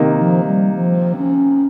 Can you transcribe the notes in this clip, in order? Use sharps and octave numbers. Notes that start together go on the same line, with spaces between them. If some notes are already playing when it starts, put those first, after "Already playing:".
Already playing: C3 D#3 A#3 D#4
F3
G3
F3
C#4